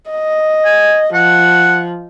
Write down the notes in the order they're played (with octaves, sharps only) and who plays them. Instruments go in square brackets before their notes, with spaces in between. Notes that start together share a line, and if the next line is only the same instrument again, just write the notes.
[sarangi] D#5
[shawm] G#5
[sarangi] F3 [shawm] F#5